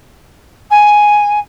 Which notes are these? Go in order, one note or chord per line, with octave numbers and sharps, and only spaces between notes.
G#5